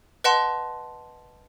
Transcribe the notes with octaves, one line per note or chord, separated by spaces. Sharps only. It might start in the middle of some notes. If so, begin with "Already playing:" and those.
B4 D#5 F#5 A5 C6